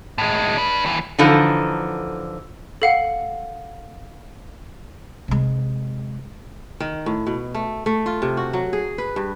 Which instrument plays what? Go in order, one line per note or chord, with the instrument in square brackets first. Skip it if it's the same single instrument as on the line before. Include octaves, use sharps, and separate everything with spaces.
[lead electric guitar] A2 G#3
D4 B4
D#2 E3
[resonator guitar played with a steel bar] D3 E3 F3 D#4 A4
[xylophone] A4 F5 F#5
[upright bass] C3 G#3
[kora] D#3
A2
B2
A3
A3
F4
C3
F#4
F#3
G#4
B4
G2